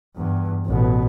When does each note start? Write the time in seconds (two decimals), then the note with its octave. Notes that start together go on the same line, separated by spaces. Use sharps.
0.16 E2 G2
0.66 A1 B2